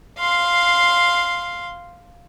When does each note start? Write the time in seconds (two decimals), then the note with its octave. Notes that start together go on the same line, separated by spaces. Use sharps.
0.19 F5 C6